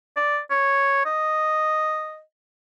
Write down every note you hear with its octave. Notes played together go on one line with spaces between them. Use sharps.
D5
C#5
D#5